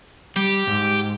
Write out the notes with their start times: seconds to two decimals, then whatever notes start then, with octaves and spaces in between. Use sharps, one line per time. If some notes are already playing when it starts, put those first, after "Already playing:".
0.36 G3 G4
0.67 G#2